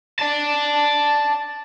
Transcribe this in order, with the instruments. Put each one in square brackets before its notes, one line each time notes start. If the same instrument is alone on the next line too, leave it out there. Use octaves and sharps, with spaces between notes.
[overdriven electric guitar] D5 A5